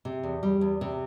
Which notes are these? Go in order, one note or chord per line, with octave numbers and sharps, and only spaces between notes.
C3
E2
G3
E2
C3